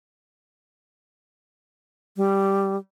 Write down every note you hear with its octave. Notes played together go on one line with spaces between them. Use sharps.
G3